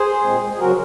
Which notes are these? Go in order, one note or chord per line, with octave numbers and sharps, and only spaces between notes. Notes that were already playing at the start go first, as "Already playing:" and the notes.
Already playing: G#4 C5
A#2 G#3 C4
G#4
C#3 F#3 C4 F#4 A#4